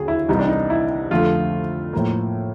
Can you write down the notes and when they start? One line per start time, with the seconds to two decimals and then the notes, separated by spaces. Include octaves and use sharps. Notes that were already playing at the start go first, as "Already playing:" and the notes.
Already playing: D#2 D3 F#3 G#4
0.08 E4
0.29 C2 C3 E3 G3 B3 D#4
0.39 D4
0.48 D#4
0.70 E4
1.11 F2 D3 F3 A3 F4
1.93 A2 F3 A#3